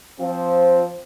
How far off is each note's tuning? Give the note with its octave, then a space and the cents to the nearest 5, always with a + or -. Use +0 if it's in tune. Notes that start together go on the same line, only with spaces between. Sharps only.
F3 +0 C4 +0